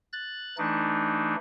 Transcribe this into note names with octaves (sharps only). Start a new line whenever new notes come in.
F#6 A6
E3 A3 D4 D#4